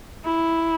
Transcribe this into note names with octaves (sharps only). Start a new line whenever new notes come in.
E4